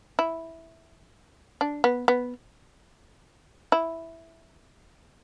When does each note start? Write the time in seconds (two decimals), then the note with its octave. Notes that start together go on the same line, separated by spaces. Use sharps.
0.19 E4
1.61 D4
1.84 B3
2.08 B3
3.72 E4